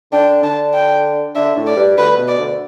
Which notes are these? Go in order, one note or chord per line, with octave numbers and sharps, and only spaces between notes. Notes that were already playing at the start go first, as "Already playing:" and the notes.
D3 D4 G5
D3 D4 A5
G5
D3 D4 E5
A2 A3
D5
G2 G3
D2 D3 B4
B2
D5
D2 D3